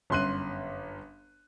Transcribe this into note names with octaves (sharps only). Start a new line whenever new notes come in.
G1 F#2 C6 F#6 D#7